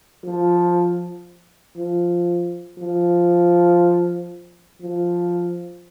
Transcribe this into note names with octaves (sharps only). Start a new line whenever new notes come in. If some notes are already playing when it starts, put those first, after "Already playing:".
F3
F3
F3
F3